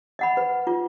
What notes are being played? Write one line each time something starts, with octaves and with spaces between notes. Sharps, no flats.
D#5 F#5 B5
B4
F4